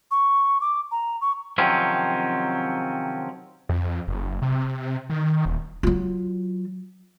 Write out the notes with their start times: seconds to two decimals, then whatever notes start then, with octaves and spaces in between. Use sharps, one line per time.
0.11 C#6
0.61 D6
0.92 A#5
1.21 C#6
1.58 C3 D#3 F3 F#3 C4 C#4
3.69 F2
4.08 F#1
4.42 C3
5.10 D#3
5.45 D#1
5.83 F#3 F4